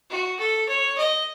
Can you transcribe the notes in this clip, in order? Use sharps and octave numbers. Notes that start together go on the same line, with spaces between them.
F#4
A4
C#5
D#5